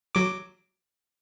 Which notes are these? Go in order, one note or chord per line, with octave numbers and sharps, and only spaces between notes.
F#3 D6